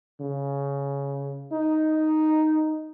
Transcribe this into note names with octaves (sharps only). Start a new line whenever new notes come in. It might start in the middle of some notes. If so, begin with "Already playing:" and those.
C#3
D#4